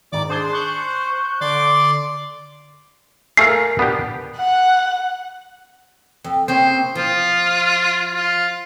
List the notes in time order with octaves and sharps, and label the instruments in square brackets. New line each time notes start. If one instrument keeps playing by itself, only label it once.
[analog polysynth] G#2 D#3 [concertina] D5 D6
[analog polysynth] D4 G#4 C6 [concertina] C5
[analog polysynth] C#6 F#6 G6
[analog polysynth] D3 [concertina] D5 C6 D6
[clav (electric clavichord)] A3 F5 [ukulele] A#4 G#5 [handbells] C7
[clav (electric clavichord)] B3 D4 G4
[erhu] F#5
[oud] F2
[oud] C#3 A#3 C4 [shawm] C5
[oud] F3 [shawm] F4
[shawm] F4